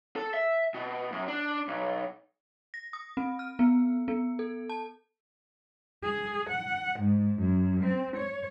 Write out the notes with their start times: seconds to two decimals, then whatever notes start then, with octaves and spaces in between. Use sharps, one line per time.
0.16 A4
0.34 E5
0.74 B2
1.12 F#2
1.28 D4
1.68 B1
2.74 A#6
2.93 D#6
3.17 C4
3.39 F6
3.59 B3
4.08 B3
4.39 A4
4.69 A5
6.03 G#4
6.49 F#5
6.99 G#2
7.40 F#2
7.83 C4
8.16 C#5